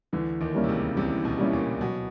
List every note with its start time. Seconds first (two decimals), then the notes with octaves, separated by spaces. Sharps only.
0.13 D2 D3 E3
0.41 D#2 D#3
0.55 G3 A#3 C#4 E4
0.64 C3
0.69 C#2 C#3
0.97 C2 C3 E3
1.25 B2
1.39 G3 A#3 C#4 E4
1.53 A#2
1.81 B2 F#3